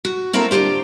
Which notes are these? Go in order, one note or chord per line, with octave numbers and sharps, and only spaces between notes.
F#4
A#3 C4 E4 F#4 A4 A#4
D2 G2 F4 G4 C5